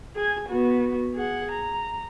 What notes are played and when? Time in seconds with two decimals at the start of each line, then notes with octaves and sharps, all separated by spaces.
0.15 G#4 G#5
0.49 B3 F#4
1.15 G#4 F#5
1.52 A#5